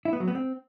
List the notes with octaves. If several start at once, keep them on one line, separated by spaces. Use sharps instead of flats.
E4
B3
F#3
B3
C4